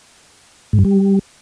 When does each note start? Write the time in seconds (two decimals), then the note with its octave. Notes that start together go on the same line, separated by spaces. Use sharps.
0.73 G#2
0.79 G2
0.85 G3